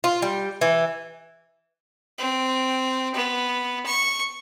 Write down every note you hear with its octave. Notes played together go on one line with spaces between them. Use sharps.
F4
G3
E3
C4
B3
C#6